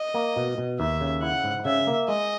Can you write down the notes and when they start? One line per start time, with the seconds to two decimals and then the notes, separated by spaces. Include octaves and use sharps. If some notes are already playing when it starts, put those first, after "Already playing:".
Already playing: D#5
0.14 A#3
0.36 B2
0.58 B2
0.79 D#2 E5
1.01 C#3
1.22 E4 F#5
1.44 G#2
1.65 C#3 E5
1.87 A#3
2.08 G#3 D#5